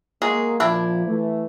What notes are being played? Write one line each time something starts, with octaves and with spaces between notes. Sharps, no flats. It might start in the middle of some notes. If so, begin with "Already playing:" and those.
F#3 G#3 A#3 G#4
A#2 F3 D4 E4 D5
E3 A3